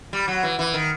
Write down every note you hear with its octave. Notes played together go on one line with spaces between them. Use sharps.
G3
F#3
E3
E3
D#3